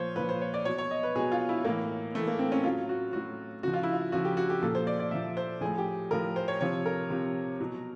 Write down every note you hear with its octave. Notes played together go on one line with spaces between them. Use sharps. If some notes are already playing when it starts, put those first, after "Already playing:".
Already playing: A#2 F3 C5 C#5
A#2 F3 B4
C5
C#5
D5
B2 F#3 C#5
C#5
D#5
B4
B2 F#3 G#4
F4
E4
A2 E3 A#3
A2 E3 A3
A#3
C4
C#4
A2 F#3 F4
F#4
A2 F#3 F#4
C#3 F3 F#4
F4
E4
F4
C#3 F3 F#4
G4
F#4
G4
A#2 F3 A4
C5
D5
D5
A#2 F3 E5
C5
A2 F3 G#4
G4
A2 F3 A#4
C5
C#5
C3 F3 C#5
A#4
C3 F3
B2 F#3